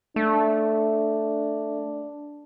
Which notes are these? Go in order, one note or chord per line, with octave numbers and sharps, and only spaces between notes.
A3 D4